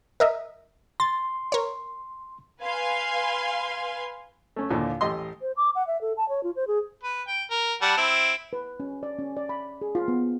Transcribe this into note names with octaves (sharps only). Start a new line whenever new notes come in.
A#4 D#5 E5
C6 A6
A#4 C#5
B4 F5 G#5 C6
A3 C#4
D#2 A#2 D3 E3 F3
A1 G4 D#5 C6
C5
D6
F#5
E5
A4
A5
C#5
F4
C5
G#4
B4
G5
A#4
G3 F#5 A5
C4 E4
B4
C#4
D5
C#4
D5
B5
G#4
F4
B3